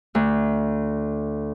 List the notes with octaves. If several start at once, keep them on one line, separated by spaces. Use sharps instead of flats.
D2